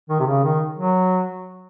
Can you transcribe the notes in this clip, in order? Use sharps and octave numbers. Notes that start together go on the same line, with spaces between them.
D#3
C3
C#3
D#3
F#3